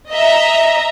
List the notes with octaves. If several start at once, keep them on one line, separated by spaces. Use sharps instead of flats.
D#5 E5 A#5